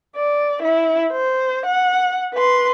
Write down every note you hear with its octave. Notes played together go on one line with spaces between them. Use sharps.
D5
E4
C5
F#5
B4 C6